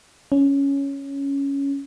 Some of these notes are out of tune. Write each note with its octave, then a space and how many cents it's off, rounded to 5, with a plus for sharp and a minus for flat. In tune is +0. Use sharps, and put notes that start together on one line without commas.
C#4 +5